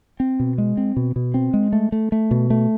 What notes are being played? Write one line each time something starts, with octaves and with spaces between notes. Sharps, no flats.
C4
B2
G#3
C4
B2
B2
C4
G#3
A3
A3
A3
B2
A3